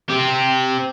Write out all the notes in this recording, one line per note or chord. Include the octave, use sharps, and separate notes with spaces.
C4 G4